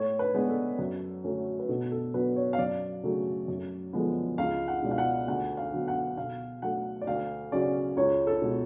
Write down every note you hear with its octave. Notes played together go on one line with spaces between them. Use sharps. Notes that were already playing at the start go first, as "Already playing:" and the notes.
Already playing: A2 C#5
B4
G#3 B3 D4
A4
F#2
D3 F#3 A3 C#4
B4
B2 A4
A4
F#3 B3 D4 B4
C#5
F5
F#2 D5
C#3 F#3 A3 C#4
F#2
D3 F3 G#3 B3
C#2 F5
F#5
B2 G#3 B3 D4
F5
F#5
D2 F#5
F5
D3 F#3 B3
F#5
B2 F5
F#3 A3 F#5
D5
D2 F5
C#3 F#3 C#4 D5
C#2 C#5
A4
B2 G#3